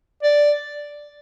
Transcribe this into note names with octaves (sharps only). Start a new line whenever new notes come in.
D5